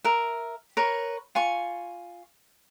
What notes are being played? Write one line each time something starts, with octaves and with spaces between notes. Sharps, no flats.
A#4 E5
A#4 B4 C#5
F4 G#5 C#6